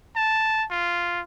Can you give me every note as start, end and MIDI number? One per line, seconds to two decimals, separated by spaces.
0.16 0.65 81
0.71 1.20 65